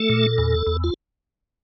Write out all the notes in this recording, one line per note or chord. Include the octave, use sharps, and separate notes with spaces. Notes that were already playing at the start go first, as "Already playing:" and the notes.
Already playing: A3 A4
A#2
E2
E2
F4